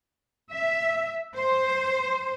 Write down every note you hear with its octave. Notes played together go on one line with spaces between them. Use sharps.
E5
C5